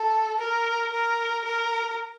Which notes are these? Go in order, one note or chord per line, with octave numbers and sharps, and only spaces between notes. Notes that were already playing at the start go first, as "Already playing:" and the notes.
Already playing: A4
A#4
A#4
A#4